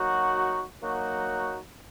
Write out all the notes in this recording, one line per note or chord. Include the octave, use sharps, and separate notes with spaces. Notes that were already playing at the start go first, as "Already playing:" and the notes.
Already playing: F#3 A#3 D#4 F#4
F#3 A#3 D#4 F#4